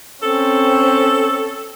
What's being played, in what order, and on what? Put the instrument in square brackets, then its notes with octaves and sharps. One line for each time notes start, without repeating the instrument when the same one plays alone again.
[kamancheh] C4 C#4 [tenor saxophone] A4